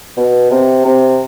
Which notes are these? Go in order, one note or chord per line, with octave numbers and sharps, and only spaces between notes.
B2
C3
C3